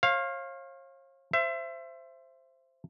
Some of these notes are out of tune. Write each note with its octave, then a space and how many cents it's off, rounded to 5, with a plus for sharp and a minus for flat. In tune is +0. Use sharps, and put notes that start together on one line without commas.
C#5 -45 F5 +0
C5 +0 E5 +30